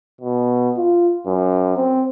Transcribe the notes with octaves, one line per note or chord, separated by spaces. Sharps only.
B2
F4
F#2
C4